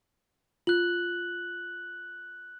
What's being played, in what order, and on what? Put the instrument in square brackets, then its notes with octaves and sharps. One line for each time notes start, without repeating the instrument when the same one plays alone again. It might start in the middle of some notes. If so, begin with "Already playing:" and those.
[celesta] F4 [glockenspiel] F#6 F#7